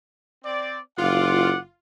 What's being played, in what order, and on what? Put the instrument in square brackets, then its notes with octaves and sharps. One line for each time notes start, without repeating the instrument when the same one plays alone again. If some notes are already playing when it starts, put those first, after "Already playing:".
[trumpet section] C4 D5
[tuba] F#1 [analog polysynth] F4 [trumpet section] F#5 D6